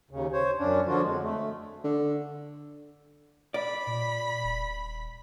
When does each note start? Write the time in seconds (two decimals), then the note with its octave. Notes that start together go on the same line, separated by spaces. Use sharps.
0.11 D#2 C#3
0.33 C5 C#5
0.58 F#2 C#4 D4
0.86 D3 F3 D4 F4 F#4
1.02 F2 G#3
1.22 A3
1.84 D3
3.54 D5 B5
3.87 A#2
4.44 D#1